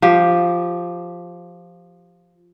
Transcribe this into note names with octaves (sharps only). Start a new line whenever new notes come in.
F3 G4